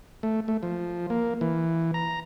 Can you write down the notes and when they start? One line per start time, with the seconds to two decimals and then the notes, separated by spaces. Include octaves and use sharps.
0.23 A3
0.48 A3
0.63 F3
1.10 A#3
1.41 E3
1.94 A#5